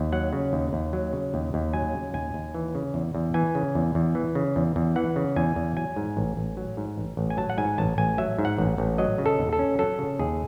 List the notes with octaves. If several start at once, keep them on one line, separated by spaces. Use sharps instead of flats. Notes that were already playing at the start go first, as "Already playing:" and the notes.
Already playing: D#2
F#3 F#5
C#3
D#2
D#2
F#3
C#3
D#2
D#2
F#3 G#5
C#3
D#2 G#5
D#2
E3
C#3
E2
E2
E3 G#5
C#3
E2
E2
E3
C#3
E2
E2
E3 F#5
C#3
E2 G#5
E2
F#3 G#5
G#2
A1
A1
F#3
G#2
A1
A1
G#5
F#3 A5
F#5
G#2 G#5
A1 A5
A1 G#5
F#3 E5
G#2
F#5
A1
A1
F#3 D#5
C#3
A4
D#2
A4
C#4
F#3 A4
C#3
D#2 G#4